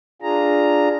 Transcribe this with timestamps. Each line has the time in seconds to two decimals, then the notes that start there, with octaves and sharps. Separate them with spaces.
0.22 D4 F4 G#4 A#5